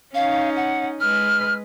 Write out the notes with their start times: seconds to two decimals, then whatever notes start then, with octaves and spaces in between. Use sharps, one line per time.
0.14 C#4 D#4 F5
0.56 F#5
1.00 G#3 B4 F6